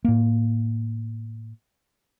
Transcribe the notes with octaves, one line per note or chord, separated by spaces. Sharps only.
A2 A#3